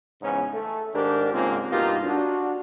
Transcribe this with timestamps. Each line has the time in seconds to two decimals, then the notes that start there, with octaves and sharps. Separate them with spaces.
0.22 E2 G#2 C#3 B3 C#4
0.53 A3
0.95 G#2 D#3 D4 G4 A#4
1.33 G#2 C#3 G#3 A#3 C4 F4
1.71 G2 B2 A#3 D#4 F4 G4
2.04 D4 F#4